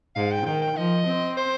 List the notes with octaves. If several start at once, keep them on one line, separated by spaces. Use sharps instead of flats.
G#2 F5
G5
D#3 G5
G5
F3 D#5
C4
C5